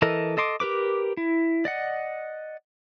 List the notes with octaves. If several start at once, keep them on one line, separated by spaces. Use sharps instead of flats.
E3 A4 A#4 D#5
A4 D#5 C6 D6
G4 A#4 B4 D6
E4
D5 D#5 F#5